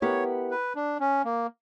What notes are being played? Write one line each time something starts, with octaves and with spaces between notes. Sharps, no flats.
B3 E4 G4 A#4 C#5
B4
D4
C#4
A#3